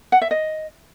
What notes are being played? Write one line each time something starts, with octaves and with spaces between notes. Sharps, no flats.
F#5
E5
D#5